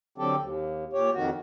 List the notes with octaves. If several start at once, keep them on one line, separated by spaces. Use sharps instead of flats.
D3 F#3 C4 G4 A4
D#2
A#2 G4 C#5
F2 D#3 F#4